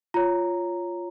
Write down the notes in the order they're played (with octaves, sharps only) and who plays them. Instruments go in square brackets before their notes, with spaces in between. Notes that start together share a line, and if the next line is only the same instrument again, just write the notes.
[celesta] F4 C#5 A#5